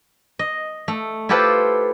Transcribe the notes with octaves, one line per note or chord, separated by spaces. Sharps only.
D#5
A3
E4 F4 G4 A4 B4 C5